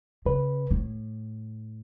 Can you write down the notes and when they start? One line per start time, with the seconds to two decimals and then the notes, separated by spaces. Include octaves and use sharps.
0.26 C#3 B4
0.71 A2